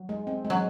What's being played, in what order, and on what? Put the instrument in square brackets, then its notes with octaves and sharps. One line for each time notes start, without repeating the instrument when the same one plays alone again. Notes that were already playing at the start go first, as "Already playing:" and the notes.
Already playing: [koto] F#3
[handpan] G#3
C4
G#3
[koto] F#3